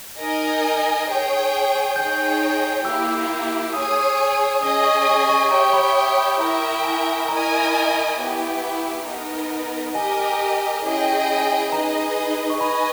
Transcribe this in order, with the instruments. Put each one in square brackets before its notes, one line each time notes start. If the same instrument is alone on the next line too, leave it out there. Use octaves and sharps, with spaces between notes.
[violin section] D#4 A#4 D#5 G#5
G#4 C#5 G5
[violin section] D#4 G#4 C#5 G5 [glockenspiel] G6
[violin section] A#3 E4 G4 [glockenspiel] E6
[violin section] G#4 C#5 G#5 [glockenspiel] D#6
[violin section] C#4 G#4 D#5 G#5 [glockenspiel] D#6
[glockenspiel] C#6
C#6
C#6
[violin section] G4 C#5 E5 G5 [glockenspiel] A#5
[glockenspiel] B5
D#6
B5
[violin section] E4 A#4 E5 G5 [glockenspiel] A#5
[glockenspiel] G#5
[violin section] E4 A#4 D#5 G#5 [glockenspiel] A#5
[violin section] B3 E4 G4
B3 D#4 A#4
[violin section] G4 A#4 D#5 [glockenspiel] G#5
[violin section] C#4 E4 G#4 D#5 G5
[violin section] D#4 G#4 B4 D#5 [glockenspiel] A#5
[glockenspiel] C#6
[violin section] B4 D#5 G#5 [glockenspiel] B5